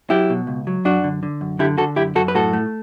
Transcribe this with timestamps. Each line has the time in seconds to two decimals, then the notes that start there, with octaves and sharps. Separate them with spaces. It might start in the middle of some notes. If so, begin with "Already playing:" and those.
0.10 F#3 E4 G4
0.30 B2
0.47 C#2
0.67 F#3
0.85 F#2 D4 F#4
1.04 D3
1.23 D3
1.41 F#2
1.59 D3 E4 G4
1.78 D3 F#4 A4
1.96 F#2 E4 G4
2.15 F#2 F#4 A4
2.28 B4
2.35 A2 F#4 A4
2.53 A3